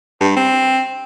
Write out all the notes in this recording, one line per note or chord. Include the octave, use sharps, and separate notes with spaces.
G2
C4